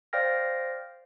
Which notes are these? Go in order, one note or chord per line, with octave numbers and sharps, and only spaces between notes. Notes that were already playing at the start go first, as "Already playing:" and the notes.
C5 D5 F5 G5 F6 A#6